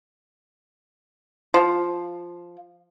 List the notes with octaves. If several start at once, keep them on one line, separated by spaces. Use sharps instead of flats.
F3